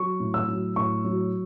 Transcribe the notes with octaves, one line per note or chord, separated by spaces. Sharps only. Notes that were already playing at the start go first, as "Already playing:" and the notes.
Already playing: F#3 C#6
A2
E6
F#3
A2 C#6
F#3